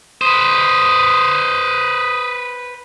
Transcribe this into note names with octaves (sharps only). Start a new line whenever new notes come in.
B4 C5 D#6